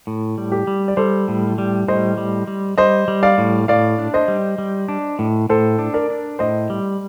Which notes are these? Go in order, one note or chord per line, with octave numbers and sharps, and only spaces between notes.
A2
G3
G4
G3
D5
G3 A4 C5
A2
G3
A2 C5 D#5
G3
G3
G3 C5 D#5
G3
D5 F5
A2
A2 D5 F5
D4
C5 D#5
G3
G3
D4
A2
A2 A4 C5
D4
A#4 D5
D4
A2 C5 D#5
G3